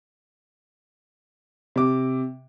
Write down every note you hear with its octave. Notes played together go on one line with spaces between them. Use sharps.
C3 D6